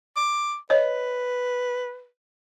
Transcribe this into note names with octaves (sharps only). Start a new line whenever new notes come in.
D6
B4 C#5 D#5